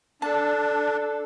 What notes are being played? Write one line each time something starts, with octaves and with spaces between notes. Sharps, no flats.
D4 A4 D5 A5